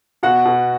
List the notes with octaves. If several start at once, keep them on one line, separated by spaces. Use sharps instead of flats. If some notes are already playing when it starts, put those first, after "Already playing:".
B2 F#4 F#5
B2